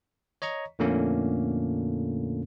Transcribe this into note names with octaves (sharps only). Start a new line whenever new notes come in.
C#5 D#5 A#5 C#6
F2 A#2 D3 A3 A#3 C#4